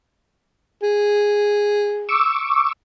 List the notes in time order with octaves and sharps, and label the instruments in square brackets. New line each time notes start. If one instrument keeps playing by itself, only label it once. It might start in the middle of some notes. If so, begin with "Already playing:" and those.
[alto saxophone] G#4
[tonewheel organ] C#6 D6 E6